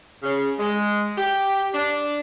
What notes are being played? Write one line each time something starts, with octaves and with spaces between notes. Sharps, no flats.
C#3
G#3
G4
D4